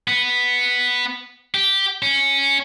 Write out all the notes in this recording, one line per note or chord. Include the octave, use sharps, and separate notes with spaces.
B3
G4
C#4